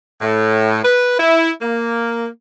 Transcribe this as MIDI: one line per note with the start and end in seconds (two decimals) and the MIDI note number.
0.21 0.79 45
0.83 1.15 71
1.19 1.49 64
1.62 2.27 58